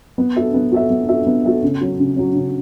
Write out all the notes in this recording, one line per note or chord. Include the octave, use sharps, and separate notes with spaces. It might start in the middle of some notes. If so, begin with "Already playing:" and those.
B3
F#4 A4 E5
B3
F#4 A4 E5
B3
F#4 A4 E5
B3
F#4 A4 E5
C#3
F#3 C#4
C#3
F#3 C#4
C#3